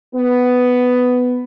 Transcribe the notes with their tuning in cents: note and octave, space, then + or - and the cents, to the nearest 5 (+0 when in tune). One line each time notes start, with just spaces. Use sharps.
B3 +10